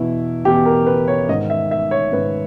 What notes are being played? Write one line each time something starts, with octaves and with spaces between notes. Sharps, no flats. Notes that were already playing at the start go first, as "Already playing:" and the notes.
Already playing: E2 B2 E4
E2 B2 G4
A#4
B4
C#5
G#2 D#3 D#5
E5
E5
C#5
G#2 D#3 B4